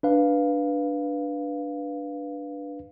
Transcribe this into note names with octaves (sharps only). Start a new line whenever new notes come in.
D4 B4 F5